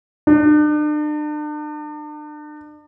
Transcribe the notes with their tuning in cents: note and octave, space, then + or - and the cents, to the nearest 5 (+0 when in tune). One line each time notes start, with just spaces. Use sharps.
D4 +40